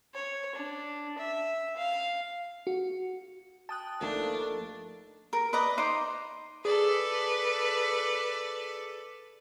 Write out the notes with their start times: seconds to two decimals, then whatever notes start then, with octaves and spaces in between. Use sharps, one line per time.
0.14 C#5
0.55 D4
1.18 E5
1.77 F5
2.67 F#4
3.69 G5 A5 D#6 F#6
4.01 G1 F3 A3 A#3 D4 D#4
5.33 A#4
5.53 B4 D5 D#5 A#5
5.77 D#4 C5 D#5 D6
6.65 G#4 A4 B4 D5